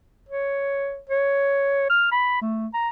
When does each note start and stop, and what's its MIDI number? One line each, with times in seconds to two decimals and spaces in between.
0.29 0.99 73
1.09 1.88 73
1.90 2.11 89
2.12 2.41 83
2.41 2.67 57
2.74 2.89 82